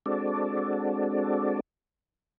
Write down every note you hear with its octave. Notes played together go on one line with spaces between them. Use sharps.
G#3 C4 D4 F#4 A4 D5